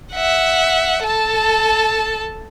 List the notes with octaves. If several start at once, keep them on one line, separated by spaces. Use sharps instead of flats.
E5 F#5
A4 A5